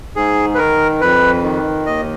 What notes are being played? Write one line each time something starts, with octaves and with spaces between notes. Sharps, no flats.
G#2 G#4
B4
D#3 A#4
F2 B4
D#3
D#2 D#5